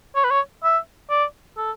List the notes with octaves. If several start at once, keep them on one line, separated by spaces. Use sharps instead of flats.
C#5
B4
C#5
E5
D5
A4